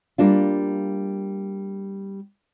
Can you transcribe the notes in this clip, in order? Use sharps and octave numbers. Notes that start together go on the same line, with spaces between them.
G3 A#3 D4 F4